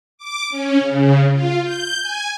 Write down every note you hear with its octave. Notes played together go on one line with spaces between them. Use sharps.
D6
C#4
C#3
F4
G6
G#5